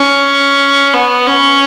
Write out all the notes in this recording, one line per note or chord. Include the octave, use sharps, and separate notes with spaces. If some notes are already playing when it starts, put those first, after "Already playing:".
Already playing: C#4
B3
C#4